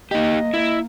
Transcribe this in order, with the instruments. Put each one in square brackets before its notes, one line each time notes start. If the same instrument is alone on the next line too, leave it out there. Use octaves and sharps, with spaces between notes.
[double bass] A#3 [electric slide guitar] D#4 G4 [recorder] D#5
[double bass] A#3 [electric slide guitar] E4